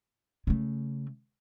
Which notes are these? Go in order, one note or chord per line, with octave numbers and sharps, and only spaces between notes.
C#3 A3